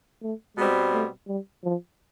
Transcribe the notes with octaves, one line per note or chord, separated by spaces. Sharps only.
A3
B2 G3 G#3 C4
A3
G3
F3